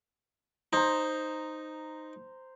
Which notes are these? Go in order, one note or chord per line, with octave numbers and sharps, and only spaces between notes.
D#4 C5 A#5